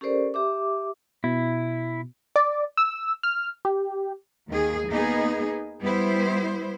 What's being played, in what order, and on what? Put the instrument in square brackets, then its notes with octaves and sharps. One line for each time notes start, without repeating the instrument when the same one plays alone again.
[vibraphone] C#4 G4 A4 A#4 C5 D5
G4 E5 D6
[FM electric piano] B2 [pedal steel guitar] E4
[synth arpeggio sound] D5
E6
F6
G4
[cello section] D#2 D#3 G#4
A#3 B3 D#4 G#4
G3 B3 E4 C5